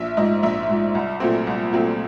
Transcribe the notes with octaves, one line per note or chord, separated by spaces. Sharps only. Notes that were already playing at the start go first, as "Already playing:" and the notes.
Already playing: A#1 E5
G#2 F3 D#5
A#1 E5
G#2 F3
C2
A#2 F#3 A3 C4
C2
A#2 F#3 A3 C4